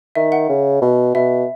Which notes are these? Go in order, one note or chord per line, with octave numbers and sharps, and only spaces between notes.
D#3 E5
F#5
C#3
B2
B2 E5